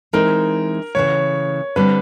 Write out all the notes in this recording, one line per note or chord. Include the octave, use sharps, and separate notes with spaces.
E3 G#3 C4 D#4 A#4
C#3 E3 A3 C#5
D3 G3 C4 B4